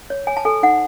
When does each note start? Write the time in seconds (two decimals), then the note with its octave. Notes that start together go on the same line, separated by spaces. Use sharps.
0.10 C#5
0.27 C#5 G#5
0.37 A5
0.45 A4 G#5
0.63 D#4 F#5